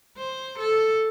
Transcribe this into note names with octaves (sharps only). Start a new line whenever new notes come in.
C5
A4